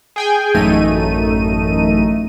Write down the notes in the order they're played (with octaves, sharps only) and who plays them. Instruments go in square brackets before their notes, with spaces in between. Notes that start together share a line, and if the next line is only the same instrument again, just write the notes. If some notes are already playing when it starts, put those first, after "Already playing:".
[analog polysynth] G#4 G5 G#5
A1 F#2 A3 D#4 D#7